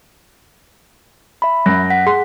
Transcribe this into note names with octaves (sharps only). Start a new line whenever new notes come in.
E5 B5
F#2 A#6
F#5 B6
G#4 C6